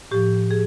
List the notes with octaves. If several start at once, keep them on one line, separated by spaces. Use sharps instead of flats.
A2 F3 G4
G#4